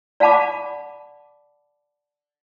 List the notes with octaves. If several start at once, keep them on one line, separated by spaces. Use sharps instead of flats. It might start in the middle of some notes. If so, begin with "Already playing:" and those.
D5 F5 F#5 A5 B5 D6